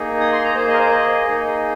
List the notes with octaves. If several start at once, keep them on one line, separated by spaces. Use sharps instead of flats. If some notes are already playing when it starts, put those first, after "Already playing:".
Already playing: A#3 D#4 G#4
D#6
C6
A#5
A#3 G#4 C5
D#5
A#4
C5
D#5
A#3 D#4 G#4